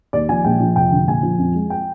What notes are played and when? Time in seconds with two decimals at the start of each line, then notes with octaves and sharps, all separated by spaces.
0.13 D#2 D5
0.29 F3 G#5
0.44 A#1 G5
0.60 F3
0.76 F1 G5
0.92 D3
1.07 A#1 G#5
1.23 F3
1.39 F2
1.54 G#3
1.70 G5